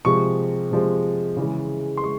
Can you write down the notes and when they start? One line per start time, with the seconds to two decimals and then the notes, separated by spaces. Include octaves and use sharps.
0.05 C3 F3 G#3 C#6
0.71 C3 F3 G#3
1.37 C#3 E3 G#3
1.97 C6
2.03 G#3 C#6